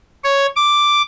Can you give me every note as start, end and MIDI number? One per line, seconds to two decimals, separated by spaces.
0.24 0.47 73
0.56 1.02 86